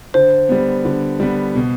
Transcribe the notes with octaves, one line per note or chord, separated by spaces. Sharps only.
D3 C5
G3 B3
D3
G3 B3
B2